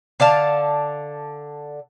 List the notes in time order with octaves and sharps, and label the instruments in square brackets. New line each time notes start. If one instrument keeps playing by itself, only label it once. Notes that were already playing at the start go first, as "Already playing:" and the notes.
[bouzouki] D3 D5 F5 A5